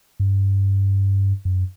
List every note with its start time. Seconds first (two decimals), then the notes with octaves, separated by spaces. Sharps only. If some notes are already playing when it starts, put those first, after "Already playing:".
0.20 G2
1.45 F#2